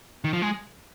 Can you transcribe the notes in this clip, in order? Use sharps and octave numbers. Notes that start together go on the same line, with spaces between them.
D#3
F3
G#3